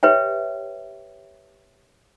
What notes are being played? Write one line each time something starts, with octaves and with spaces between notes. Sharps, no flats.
G4 B4 C#5 E5 G5